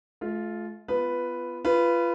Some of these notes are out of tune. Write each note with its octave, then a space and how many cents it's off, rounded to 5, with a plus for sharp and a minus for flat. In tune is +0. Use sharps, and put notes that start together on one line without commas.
A3 -40 F4 +0
B3 +15 F4 -20 B4 +0
F4 -25 B4 +0